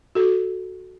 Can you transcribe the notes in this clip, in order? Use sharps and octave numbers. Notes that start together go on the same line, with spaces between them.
F#4 A4